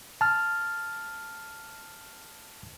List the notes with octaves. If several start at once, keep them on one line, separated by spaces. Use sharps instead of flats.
A5 F6